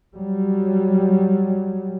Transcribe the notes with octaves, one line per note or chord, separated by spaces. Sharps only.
F#3 G3